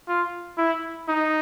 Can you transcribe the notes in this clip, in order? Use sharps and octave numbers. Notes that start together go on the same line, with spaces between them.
F4
E4
D#4